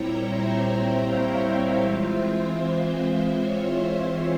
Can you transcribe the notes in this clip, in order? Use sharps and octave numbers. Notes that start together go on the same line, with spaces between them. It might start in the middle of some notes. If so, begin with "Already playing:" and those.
Already playing: A#2 G3 C4 E4 C#5 G5 A#5
C5 E5
E5 G5
C#5 F5
C5 E5
E3 G#3 C4 F4
C#5
C5 E5